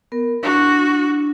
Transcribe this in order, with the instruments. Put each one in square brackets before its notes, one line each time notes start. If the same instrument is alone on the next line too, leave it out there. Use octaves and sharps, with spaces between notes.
[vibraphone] B3 A#4
[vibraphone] D4 E4 [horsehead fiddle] F#4